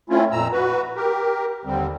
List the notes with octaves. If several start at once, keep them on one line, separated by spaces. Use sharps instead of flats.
A3 C4 C#4 E4 F4
F2 A#2 A#5 E6
F#4 B4
G4 A#4
D#2 D3 G3 C4